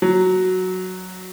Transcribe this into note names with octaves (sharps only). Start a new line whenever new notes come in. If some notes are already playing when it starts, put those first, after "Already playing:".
F#3